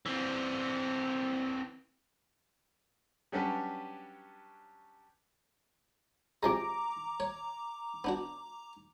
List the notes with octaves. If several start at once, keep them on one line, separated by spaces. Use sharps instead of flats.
E3 C4
F#3 G3 C#4 D4 B4
C3 F3 G#3 A#5 D6
C#5
B3 D4 F#4